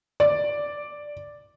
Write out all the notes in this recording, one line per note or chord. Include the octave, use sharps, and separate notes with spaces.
D5